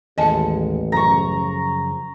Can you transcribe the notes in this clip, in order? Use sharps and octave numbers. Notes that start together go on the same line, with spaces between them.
A1 D#2 G#3 D#5 G#5 A5 C#7
F#2 C#3 F3 A#5 C#6